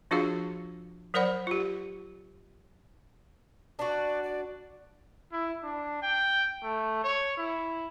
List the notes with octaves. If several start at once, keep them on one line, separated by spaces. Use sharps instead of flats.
F3 D4 F4 F#4 G#4 F5
F#3 A#4 C5 D5 F#5 B5
F4 G4
D4 F#4 D5
D5
E4
D4
G5
A3
C#5
E4